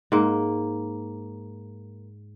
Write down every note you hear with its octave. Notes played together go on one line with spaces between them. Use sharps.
G#2 A#3